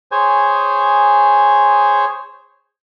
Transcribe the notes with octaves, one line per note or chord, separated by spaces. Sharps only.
G#4 C5 C#5 G#5